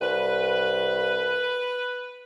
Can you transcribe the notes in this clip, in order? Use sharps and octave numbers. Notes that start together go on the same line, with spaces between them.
C2 B4